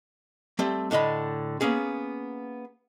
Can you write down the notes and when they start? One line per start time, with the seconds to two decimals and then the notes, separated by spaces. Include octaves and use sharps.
0.59 G3 A3 C4
0.91 A2 D3 D#5 B5
1.61 A#3 B3 C#4 G#4